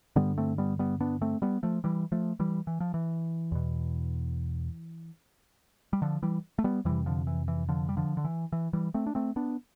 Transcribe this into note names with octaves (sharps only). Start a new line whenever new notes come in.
G2 D3 G3 B3
A3 C4
G3 B3
G3 B3
B3 D4
A3 C4
G3 B3
F3 A3
E3 G3
F3 A3
E3 G3
E3
F3
E3
E2 B2
G3
D3 F3
E3 G3
A3
G3 B3
F2 C3 E3 G3
D3 F3
E3
E3
D3 F3
G3
D3 F3
D3
E3
E3
E3 G3
A3 C4
D4
A3 C4
B3 D4